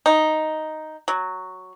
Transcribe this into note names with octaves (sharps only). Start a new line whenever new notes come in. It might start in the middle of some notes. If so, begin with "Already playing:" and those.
D#4
F#3